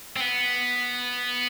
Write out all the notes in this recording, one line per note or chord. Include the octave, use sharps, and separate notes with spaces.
C4
B3